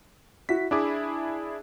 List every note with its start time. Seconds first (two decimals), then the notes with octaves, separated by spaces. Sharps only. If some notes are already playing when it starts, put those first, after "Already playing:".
0.49 E4 F#4 B6
0.71 D4 E4 G#4 D6